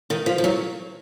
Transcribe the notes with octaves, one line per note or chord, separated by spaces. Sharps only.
D#3
F3
F3
F#3